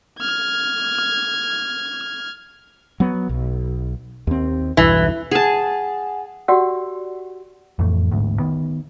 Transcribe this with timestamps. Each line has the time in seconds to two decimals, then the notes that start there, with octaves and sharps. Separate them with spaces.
0.19 F6 G#6
3.00 F#3 B3
3.29 B1
4.27 D#2 C4
4.77 B1 E2 G2 E3
5.31 G#4 F#5 G#5 A5
6.48 F#4 G4 D5 F#5 E6
7.79 F2 A2 E3 A3
8.12 A1 D2 G#2
8.39 D#3 B3